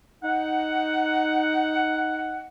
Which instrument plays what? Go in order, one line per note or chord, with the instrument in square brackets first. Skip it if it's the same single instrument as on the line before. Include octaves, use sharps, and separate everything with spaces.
[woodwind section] D#4 F#5